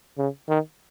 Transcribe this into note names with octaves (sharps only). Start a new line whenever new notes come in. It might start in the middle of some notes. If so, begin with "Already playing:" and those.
C#3
D#3